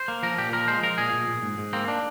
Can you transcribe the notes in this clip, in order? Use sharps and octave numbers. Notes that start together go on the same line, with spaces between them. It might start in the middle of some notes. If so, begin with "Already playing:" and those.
Already playing: C5
A#3
F3 A#4
A#2 G4
F3 A#4
G#3 C5
F3 A#4
A#2 G#4
A#2
A#2
G#2
G#2
A#3 C4
D4